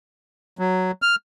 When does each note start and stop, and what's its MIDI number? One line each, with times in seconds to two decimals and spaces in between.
0.59 0.91 54
1.02 1.15 89